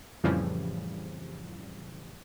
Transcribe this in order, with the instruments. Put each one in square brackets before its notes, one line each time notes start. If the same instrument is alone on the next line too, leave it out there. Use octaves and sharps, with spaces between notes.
[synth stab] F2 A2 C#3 E3 F3 G3